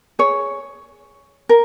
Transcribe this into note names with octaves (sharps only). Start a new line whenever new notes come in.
G#4 C#5
A#4